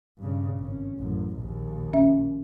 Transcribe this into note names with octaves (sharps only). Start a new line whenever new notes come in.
G2 C#3
G#1 C#4
A1 F#2
A#1 D#2
C#4 E5